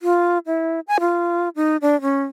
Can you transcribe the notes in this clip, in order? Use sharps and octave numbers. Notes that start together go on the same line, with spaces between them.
F4
E4
G#5
F4
D#4
D4
C#4